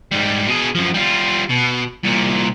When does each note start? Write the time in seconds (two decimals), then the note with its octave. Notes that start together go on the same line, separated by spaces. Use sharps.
0.12 G#2 G3
0.47 B2 G#4
0.75 F#2 F3
0.94 G3 F4
1.49 B2
2.03 C2 A#2